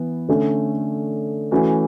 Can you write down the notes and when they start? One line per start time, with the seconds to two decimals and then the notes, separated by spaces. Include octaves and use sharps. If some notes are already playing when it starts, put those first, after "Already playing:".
Already playing: E3 B3
0.29 D3 A3 C#4
1.51 E3 A3 C#4 F#4